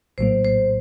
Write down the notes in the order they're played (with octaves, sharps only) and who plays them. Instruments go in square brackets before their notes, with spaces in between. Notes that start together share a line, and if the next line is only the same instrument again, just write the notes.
[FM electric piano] A#1 A2 F#3 A#3 [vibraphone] C5
[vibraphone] C5